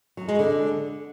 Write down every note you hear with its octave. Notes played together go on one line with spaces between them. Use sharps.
F#3
G#3
D3